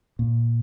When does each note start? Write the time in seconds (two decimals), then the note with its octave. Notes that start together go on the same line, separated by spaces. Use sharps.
0.19 A#2